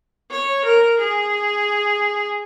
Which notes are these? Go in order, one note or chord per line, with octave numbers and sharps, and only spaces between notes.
C#5
A#4
G#4